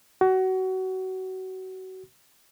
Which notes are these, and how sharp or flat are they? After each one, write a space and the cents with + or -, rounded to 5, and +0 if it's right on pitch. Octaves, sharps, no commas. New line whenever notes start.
F#4 +25